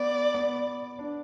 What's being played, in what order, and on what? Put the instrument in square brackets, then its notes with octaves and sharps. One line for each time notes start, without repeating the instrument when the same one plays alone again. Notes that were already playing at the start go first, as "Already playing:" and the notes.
Already playing: [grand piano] B3 [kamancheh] D5
[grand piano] B3
D4